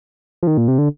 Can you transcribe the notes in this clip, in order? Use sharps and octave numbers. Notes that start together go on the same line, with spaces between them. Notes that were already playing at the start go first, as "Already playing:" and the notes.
F3
D#3
A#2
C3
D3